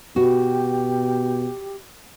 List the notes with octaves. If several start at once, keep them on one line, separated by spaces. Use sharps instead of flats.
B2 F#4 G4